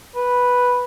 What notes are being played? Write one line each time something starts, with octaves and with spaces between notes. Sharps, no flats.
B4